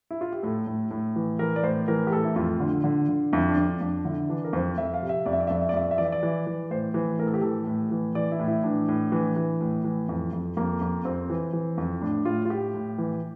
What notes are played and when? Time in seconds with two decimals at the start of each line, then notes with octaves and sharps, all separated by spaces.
0.11 E4
0.21 F4
0.32 G4
0.43 A2 A4
0.67 A2
0.91 A2
1.16 E3
1.39 E3 A#4
1.56 D5
1.63 A2 C5
1.88 E3 A#4
2.07 G4
2.12 A2 A4
2.25 E4
2.36 F2 F4
2.60 D3
2.84 D3
3.09 D3
3.33 F2 E4
3.49 D4
3.57 F2
3.65 D4
3.81 F2 D4
4.05 D3 E4
4.29 E3 D4
4.44 A#4
4.53 F2 C5
4.78 F2 E5
4.94 F5
5.02 C3
5.09 E5
5.26 F2 D5
5.33 E5
5.40 D5
5.47 E5
5.50 F2 D5
5.61 E5
5.69 D5
5.74 F2 E5
5.84 D5
5.91 E5
5.98 E3 D5
6.05 E5
6.12 D5
6.23 E3
6.47 E3
6.70 A2 C5
6.94 E3
7.19 A2 A#4
7.27 A4
7.34 G4
7.42 E3 A4
7.67 A2
7.91 E3
8.15 E3 D5
8.32 E4
8.39 A2
8.48 E4
8.64 E3 D4
8.88 A2
9.12 E3
9.36 E3
9.61 A2
9.84 E3
10.09 F2
10.33 F2
10.57 F2 A#3
10.81 F2
11.05 F2 C4
11.30 E3
11.53 E3
11.78 F2
12.01 A2 D4
12.25 A2 F4
12.45 F4
12.50 A2 G4
12.74 A2
12.98 E3